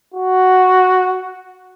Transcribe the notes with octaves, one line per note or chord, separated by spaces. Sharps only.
F#4